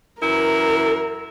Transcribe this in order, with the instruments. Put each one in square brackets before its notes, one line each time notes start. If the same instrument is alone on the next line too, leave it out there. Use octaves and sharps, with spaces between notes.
[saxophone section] F#2 E3 E4 [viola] A#4